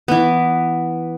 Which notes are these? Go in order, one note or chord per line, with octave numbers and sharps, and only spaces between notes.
E3 B3